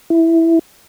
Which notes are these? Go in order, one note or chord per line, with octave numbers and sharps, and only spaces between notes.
E4